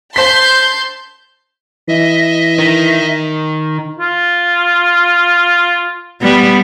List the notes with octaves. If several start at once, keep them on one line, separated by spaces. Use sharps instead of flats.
C5 A5 C6 G6 B6
E3 D#5 E5
D#3
F4
G3 B3